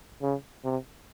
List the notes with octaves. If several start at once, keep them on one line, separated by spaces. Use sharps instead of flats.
C#3
C3